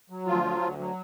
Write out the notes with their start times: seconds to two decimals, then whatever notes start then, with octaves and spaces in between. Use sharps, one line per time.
0.10 F#3
0.27 D2 F3 F4
0.44 F#3
0.61 D2
0.79 F#3